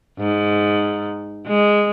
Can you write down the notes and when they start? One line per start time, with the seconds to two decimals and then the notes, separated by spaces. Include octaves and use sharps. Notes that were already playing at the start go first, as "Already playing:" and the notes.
0.19 G#2
1.47 G#3